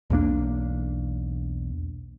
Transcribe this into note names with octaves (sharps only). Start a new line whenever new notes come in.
B1 E2 A#3 D4